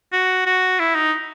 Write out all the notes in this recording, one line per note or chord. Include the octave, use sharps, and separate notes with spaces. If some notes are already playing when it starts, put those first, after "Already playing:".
F#4
F#4
E4
D#4